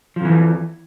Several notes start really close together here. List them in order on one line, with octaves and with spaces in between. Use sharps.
F3 F2 E3